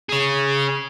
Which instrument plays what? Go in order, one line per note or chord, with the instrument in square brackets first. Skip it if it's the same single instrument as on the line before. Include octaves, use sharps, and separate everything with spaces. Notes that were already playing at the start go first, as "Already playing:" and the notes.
[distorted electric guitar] G#4 C#5